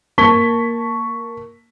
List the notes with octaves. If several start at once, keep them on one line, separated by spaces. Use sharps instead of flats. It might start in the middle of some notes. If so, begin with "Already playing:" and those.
A#3 A5 C#6 G#6 B6 G7